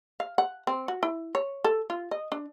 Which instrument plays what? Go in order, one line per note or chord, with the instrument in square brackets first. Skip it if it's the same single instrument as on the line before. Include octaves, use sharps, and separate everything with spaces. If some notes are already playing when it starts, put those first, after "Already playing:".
[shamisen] F5
F#5
C4
F#4
E4
C#5
A4
F4
D#5
D4